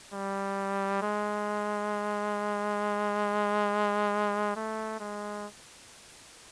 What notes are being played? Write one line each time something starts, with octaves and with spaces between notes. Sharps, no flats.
G3
G#3
A3
G#3